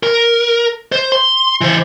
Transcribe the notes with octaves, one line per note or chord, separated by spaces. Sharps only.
A#4
C5
C6
E3 C5